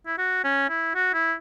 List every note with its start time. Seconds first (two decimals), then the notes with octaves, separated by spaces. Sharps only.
0.07 E4
0.18 F#4
0.44 C#4
0.70 E4
0.95 F#4
1.14 E4